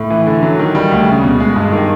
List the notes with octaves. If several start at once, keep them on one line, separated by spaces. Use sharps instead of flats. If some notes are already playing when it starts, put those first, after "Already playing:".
Already playing: A2
E3
D3
F#3
D#3
G3
D2
C#3
B2
G#3
G2
D#3